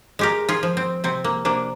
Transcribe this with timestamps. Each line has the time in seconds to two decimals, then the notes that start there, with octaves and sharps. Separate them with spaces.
0.19 G#3 G4 A#4
0.49 F4 G#4
0.63 F3
0.77 C4
1.04 C3 C4
1.24 A#3
1.45 C3 A#3 D4